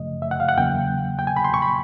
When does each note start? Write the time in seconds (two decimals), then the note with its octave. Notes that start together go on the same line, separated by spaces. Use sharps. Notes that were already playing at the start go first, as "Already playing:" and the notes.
Already playing: F#2 C#3 F3 A3 D#5
0.22 E5
0.31 F#5
0.40 F5
0.49 F#5
0.57 E2 C#3 F#3 A#3 G5
1.19 G5
1.27 G#5
1.37 B5
1.44 C6
1.54 C#6
1.62 B5